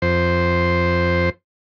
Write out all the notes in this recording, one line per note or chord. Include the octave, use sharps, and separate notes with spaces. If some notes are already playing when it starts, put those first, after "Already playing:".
F2 C5